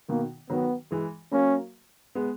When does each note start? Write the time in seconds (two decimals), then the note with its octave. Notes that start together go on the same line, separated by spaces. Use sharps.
0.09 B2 D#3 A#3
0.50 D#3 F#3 B3
0.91 E3 G#3
1.32 F#3 A#3 C#4
2.15 G#3 B3